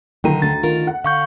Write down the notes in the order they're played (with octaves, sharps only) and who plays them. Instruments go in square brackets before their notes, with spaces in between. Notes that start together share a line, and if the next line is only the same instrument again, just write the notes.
[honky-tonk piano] B1 D#3 D#7 [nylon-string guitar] D3 [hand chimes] G5 A#5
[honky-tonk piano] D2 [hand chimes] A6
[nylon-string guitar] D#3 F4 A#4
[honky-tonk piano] F#5
[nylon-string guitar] D3 [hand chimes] F5 C#6 G6